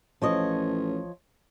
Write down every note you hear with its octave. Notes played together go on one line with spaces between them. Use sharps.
A1 F3 C#5 D#5